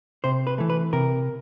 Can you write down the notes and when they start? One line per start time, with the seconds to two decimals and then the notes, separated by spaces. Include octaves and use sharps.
0.24 C3 C5
0.47 B4
0.58 E3 A3
0.70 B4
0.93 C3 A#4